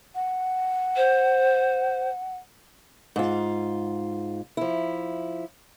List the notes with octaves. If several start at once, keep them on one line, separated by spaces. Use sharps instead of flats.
F#5
C5
G#2 F4
F3 E4